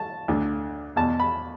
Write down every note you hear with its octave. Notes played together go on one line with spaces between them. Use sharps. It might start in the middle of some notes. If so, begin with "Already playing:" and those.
Already playing: A5
D2 D3
E2 B2 A5
B5